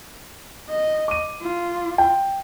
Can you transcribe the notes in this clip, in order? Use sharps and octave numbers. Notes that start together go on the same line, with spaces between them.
D#5
D6 D#7
F4
G5